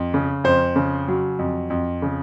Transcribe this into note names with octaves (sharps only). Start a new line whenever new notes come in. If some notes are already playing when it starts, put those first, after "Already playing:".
Already playing: F2
C#3
F2 C5
C#3
F#3
F2
F2
C#3